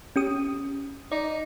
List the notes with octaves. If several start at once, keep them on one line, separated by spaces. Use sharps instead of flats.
C#4 G4 D#6
D#4 D5